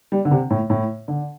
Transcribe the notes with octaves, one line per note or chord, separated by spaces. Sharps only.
G3
D3
C3
A2
A2
D3